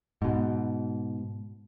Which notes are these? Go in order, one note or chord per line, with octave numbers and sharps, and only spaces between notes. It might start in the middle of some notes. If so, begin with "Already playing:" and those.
G#2 B2